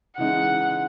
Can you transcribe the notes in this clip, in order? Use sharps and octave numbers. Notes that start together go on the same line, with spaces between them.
C#3 E3 G#3 D#4 F#5